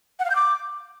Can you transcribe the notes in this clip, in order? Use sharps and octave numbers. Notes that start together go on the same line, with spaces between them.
F#5
F5
G6
D6